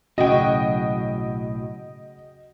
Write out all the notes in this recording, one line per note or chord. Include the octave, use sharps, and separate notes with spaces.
B1 A2 C#3 F#3 F#4 D#5 G5